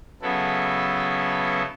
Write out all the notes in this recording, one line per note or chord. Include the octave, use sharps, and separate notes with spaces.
C#3 F#3 B3 E4 A4